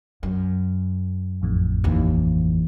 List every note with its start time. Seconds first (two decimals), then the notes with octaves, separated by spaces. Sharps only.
0.23 F#2
1.42 A1 F2 A2
1.84 D#2 E3